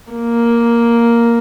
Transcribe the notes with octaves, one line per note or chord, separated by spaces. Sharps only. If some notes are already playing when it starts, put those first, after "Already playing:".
A#3